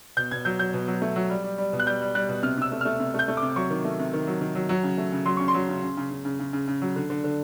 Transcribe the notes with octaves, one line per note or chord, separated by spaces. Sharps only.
B2 G6
B2 G#6
F#3 G6
F#3 G6
B2
F#3
A3
F#3
G3
G3
G3
B2
F#6
G3 G6
G3
G3 F#6
B2
C3 F6
C3 E6
A3
F6
A3
C3
A3 G6
A3
D6
C3
F#3 C#6
D#3
A3
C3
D#3
F#3
D#3
F#3
F#3
C#3
A3
C#3
F#3 C6
C#3 C#6
C6
F#3
C#3
C#3
C#3
C#3
C#3
C#3
C#3
C#3
F#3
D3
D3
D3